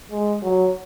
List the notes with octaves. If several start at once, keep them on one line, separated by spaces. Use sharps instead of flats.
G#3
F#3